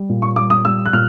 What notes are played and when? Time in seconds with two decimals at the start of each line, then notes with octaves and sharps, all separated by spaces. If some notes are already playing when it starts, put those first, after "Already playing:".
Already playing: G3
0.09 A#2
0.22 C#6
0.36 G3 D6
0.50 D#6
0.65 G3 E6
0.85 F#6
0.93 A#2 F6